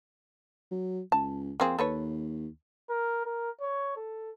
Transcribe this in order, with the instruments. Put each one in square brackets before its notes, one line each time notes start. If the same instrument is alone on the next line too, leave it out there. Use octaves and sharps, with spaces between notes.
[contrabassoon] F#3
[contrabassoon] C#2 [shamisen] A5
[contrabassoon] F2 [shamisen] A#3 C4 G#4
[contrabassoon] D#2 [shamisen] A4 B4 C#5
[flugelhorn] A#4
A#4
C#5
A4